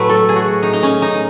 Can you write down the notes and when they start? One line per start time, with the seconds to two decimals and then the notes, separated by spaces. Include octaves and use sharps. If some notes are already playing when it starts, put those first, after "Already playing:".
Already playing: A2 F#3 A3 B4
0.09 A4
0.29 G#4
0.36 F#4
0.63 D#4
0.73 D#4
0.83 C#4
1.02 D#4